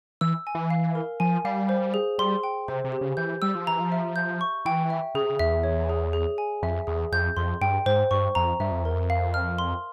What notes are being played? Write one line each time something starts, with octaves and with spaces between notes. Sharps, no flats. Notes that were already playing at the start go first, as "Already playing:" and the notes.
E3 E6
G#5
E3
F5
A#4
F3 G#5
G3 F5
C5
G#4
G3 C6
G5
C3 C5
C3
G4
C#3
E3 G6
G3 E6
F3
E3 A#5
F3
E5
G6
C#6
E3 G5
E5
C#3 G#4
C3
C#3
E2 E5
C#5
G#4
G#4
G#5
F2 E5
E2 G#4
F2 G6
F2 C6
G2 G5
G#2 C5
G2 C#6
F2 A#5
G2 E5
F2
E2 A#4
F2
F5
F6
C6